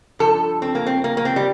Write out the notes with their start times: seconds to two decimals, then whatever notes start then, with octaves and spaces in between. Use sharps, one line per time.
0.19 G2 F3 A4
0.62 C4
0.75 A#3
0.87 C4
1.04 A#3
1.17 A#3
1.25 C4
1.36 G3